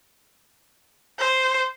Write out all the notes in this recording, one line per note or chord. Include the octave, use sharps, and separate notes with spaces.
C5